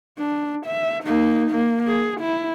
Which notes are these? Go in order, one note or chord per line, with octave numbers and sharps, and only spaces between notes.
D4
E5
A#3 D#4
A#3
G#4
E4